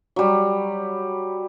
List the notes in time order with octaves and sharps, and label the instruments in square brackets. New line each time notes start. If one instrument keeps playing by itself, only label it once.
[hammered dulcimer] F#3 G3